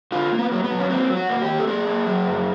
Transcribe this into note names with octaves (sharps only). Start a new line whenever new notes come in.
D3 F4
A#3
B3
F#3
B3
F#3
C#4
A#3 C4
F#3
F#4
A#3
G4
A#3
A4
A#3 G#4
A#3
F#3
F#2